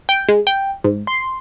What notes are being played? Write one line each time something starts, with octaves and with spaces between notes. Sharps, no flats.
G5
G#3
G5
G#2
C6